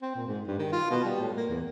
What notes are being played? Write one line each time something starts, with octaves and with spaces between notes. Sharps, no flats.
C4
A#2
G#2
G2
D#3
F4
B2
G3
A2
A#3
E2